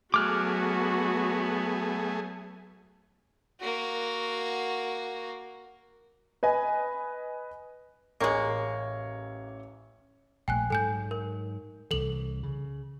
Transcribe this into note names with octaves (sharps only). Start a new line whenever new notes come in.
F#3 A3 B3 F#4 G#4 D6 F6 F#6
A#3 F#4
B4 D#5 G#5
A1 G#3 A#3 C#5 C#6
A#1 A3 G5 G#5 F#6
G#2 F#3 A4 G#5 G6
A#4
C2 E3 A4 F#7
C#3